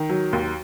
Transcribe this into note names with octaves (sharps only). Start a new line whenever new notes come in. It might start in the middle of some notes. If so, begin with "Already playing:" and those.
Already playing: D#3
F#3
D#2